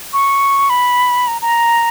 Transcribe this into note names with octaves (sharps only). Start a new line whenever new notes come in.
C#6
B5
A#5
A#5